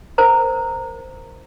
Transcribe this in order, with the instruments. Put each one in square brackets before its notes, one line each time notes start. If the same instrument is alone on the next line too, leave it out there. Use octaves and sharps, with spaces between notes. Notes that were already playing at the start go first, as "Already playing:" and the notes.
[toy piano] A#4 C5 A#5